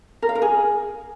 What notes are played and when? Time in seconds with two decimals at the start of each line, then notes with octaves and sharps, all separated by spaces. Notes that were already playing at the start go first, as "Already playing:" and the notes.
0.22 A#4
0.29 F5
0.35 A#4
0.42 G#4